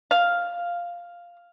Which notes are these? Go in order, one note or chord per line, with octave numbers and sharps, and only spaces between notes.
F5